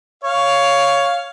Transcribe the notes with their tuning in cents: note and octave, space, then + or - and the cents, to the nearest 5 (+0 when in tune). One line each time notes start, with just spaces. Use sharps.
C#5 +10 F5 +0